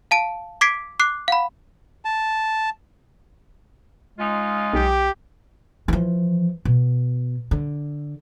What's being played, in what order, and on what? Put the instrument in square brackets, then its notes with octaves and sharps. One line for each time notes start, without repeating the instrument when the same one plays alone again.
[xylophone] F5 A5 D7
D6 G#6 B6 C7 D7
D6 F#6 C7
F5 F#5 B5
[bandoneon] A5
[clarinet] G#3 [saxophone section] C#4 D#4 F4
[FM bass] B1 [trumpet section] G4
[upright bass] E3 F3
B2
D3